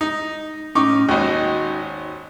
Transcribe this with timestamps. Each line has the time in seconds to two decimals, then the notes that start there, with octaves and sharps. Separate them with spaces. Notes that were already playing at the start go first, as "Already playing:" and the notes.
0.01 D#4
0.75 A2 C#4 D#4 C#6 D6
1.09 G#1 D#2 D#4 F#4 D#5